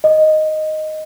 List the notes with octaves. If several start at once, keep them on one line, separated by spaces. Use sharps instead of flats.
D#5